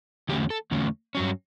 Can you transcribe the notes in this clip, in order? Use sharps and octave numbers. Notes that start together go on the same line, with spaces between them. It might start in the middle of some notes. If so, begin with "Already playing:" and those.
E2 D3 F#3 A3 C#4 G4
A4
E2 D3 F#3 A3 C#4
G2 F#3 C#4